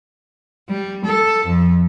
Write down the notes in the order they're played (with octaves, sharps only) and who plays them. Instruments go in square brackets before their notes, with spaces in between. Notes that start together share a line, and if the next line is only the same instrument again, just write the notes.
[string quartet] G3
A4
F2